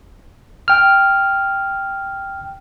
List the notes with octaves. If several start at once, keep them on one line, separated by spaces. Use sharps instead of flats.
G5 F6